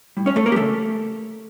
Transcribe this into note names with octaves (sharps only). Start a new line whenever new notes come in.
A2 G3
C#4 C#5
A3 A4
A#3 A#4
G4
C#3 F3 A3 A4